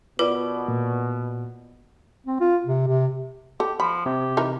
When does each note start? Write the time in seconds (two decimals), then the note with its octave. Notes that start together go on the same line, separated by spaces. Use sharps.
0.19 B2 F4 A#4 B4 D5 D6
0.68 A#2
2.26 C4
2.41 F4
2.66 C3
2.88 C3
3.60 G4 A4
3.80 F3 B5
4.06 C3 G4
4.37 E3 D#4 A#4